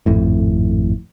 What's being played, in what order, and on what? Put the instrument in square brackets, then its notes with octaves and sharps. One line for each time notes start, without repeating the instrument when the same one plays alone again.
[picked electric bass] G#1 F2 A2